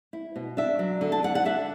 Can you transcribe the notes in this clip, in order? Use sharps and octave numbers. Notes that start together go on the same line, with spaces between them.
E4
B2
D4 E5
F#3
D3
A5
D3 F#5
F#5
D4 E5